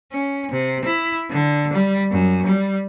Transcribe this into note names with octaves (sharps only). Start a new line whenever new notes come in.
C#4
C3
E4
D3
G3
F#2
G3